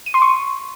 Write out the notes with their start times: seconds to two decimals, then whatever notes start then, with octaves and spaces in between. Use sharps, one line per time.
0.06 D#7
0.14 C6
0.22 C#6